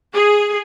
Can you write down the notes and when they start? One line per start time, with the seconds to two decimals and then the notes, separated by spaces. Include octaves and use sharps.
0.13 G#4